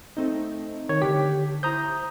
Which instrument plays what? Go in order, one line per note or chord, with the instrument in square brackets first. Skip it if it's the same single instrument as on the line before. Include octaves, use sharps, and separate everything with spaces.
[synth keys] A3 C4 D#4
[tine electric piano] D#3 C#5
[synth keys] D3 B6 [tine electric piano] G4
[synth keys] E4 C5 [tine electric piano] A#5 D#6 G6